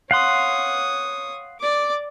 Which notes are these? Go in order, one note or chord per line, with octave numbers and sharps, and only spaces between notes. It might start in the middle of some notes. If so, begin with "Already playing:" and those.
C#5 F5 F#5 C6 D#6
D5 D6